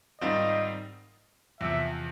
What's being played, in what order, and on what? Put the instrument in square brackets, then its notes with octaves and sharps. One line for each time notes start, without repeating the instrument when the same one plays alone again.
[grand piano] G#2 D#3 G3 C4 F4 [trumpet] D#5
[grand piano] E2 C3 F3 [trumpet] E5